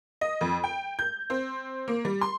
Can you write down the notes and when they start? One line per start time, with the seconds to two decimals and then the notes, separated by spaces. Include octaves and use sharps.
0.21 D#5
0.41 F2
0.64 G5
0.99 G6
1.30 C4
1.88 A#3
2.05 G3
2.21 C6